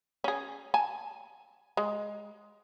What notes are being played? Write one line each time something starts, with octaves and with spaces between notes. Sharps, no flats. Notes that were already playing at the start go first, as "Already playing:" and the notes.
C#4 G#4
G#5 A5
G#3